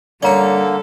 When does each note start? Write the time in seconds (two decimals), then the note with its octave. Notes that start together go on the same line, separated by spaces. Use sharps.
0.23 D3 G3 A#3 C#4 A4 C#5 D5 A#5